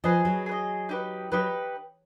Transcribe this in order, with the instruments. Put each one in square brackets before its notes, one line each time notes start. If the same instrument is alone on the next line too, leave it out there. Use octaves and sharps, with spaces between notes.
[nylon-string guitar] F3 [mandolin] G#4 B4 D#5
[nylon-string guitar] F#3
[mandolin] G#4 B4
D#5
D#4 G4 B4
[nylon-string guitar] F#3 [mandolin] D#4 G4 B4